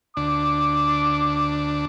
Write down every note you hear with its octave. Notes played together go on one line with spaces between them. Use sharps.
D2 D4 D6